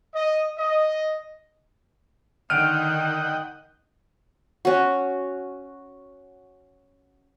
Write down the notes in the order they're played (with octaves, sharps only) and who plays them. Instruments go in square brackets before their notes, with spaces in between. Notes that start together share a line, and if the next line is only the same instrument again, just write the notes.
[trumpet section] D#5
D#5
[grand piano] D3 D7 D#7 [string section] D#3 [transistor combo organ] D#5 F#5 G5 [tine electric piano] F6
[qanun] C#4 F#4